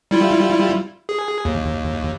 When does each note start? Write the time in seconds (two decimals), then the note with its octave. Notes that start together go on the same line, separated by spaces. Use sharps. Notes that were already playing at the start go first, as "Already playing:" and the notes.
0.11 G3 E4 F4
1.09 G#4
1.45 D#2